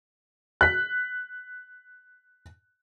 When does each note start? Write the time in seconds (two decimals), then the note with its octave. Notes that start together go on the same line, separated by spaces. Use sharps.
0.61 F#6 B6